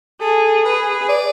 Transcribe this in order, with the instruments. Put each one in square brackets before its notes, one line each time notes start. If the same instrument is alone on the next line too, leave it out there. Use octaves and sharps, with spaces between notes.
[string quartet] G#4 [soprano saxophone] A4
[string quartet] G#4 [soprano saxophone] B4
[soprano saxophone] D5